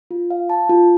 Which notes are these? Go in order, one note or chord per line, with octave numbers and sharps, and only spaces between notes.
F4
F5
A5
F4